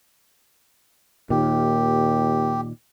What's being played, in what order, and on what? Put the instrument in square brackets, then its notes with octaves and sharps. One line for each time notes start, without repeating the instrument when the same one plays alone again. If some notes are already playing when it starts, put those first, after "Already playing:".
[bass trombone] D#2 [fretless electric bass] A#2 D#3 [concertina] G4